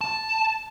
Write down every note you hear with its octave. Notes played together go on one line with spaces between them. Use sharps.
A5